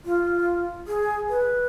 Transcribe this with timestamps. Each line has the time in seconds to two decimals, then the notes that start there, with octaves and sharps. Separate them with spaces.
0.05 F4
0.87 G#4
1.29 B4